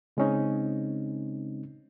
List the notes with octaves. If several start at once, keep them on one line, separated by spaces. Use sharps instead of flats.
C#3 G#3 C4 C#4 D#4